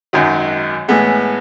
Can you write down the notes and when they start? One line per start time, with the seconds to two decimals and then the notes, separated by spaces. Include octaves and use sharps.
0.13 G#1 F#2 D#3 F#3
0.88 A2 E3 G#3 B3